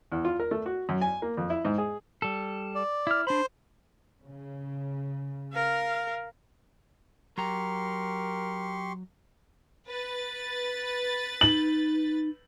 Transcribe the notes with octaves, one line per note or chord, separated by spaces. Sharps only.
E2
F4
A#4
A3
F#4
F#2
G#5
A#3
F2
E4
G#2
G#4
G3 A4
D5
E4 F6
D4 C5 B5
C#3
A#4 F5
F#3 G4 A#4 A#5 C6 C#6
B4 A6
D#4 F#7